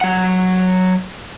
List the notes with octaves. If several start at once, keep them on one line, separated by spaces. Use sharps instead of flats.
F#3 F#5